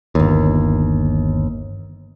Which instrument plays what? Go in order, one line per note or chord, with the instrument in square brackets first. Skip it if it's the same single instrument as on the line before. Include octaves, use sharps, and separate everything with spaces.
[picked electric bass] G1 D#2